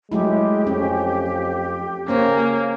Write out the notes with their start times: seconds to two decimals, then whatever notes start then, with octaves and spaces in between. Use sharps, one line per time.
0.12 F#3 G#3 A3 E4 G4
0.67 F2 C#4
2.08 C#3 A#3 C#4 C5 C#5